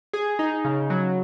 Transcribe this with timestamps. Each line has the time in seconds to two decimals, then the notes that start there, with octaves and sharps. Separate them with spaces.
0.13 G#4
0.39 D#4
0.65 C#3
0.90 F#3